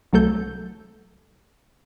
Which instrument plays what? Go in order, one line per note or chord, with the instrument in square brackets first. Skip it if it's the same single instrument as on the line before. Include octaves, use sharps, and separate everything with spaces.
[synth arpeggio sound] C2 F#3 A3 A4 G6